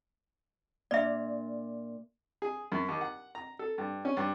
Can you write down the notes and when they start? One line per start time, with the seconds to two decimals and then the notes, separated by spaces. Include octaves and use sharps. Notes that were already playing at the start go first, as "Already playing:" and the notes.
0.91 A#2 D4 D5 E5 F6
2.42 G#4
2.72 F#2
2.89 D#2
3.01 F#5
3.35 A#5
3.59 A4
3.78 G2
4.05 C#4
4.17 G2